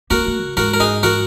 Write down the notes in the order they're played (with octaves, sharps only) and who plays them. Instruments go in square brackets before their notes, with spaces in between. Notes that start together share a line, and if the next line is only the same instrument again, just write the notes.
[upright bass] A#3 [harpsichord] F#4 A#4
[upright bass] A#3
C#3
[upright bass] G#2 [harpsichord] F#4 A#4
[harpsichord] A#4
D#4 G#4
F#4 A#4